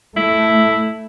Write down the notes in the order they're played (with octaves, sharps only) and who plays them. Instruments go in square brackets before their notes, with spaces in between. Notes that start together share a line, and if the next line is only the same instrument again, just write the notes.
[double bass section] A3 [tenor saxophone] E4